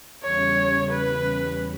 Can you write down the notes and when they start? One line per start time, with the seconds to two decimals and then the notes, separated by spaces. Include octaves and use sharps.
0.23 E2 C#3 G3 C#4 C#5
0.91 B4